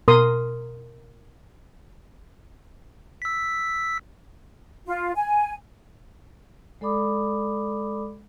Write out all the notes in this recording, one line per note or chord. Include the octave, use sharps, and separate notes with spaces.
B2 A#4 C6 D#6
E6 B6
F4
G#5
G#3 A4 D5 B5 D6 D#6